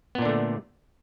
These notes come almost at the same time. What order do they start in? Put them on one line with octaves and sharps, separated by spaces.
B3 A#2 D4 D3 A3